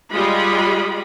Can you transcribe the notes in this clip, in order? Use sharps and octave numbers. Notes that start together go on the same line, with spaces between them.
G3 G#3 F4 D#5 B5